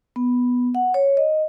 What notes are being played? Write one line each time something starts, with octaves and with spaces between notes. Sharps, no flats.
B3
F#5
C#5
D#5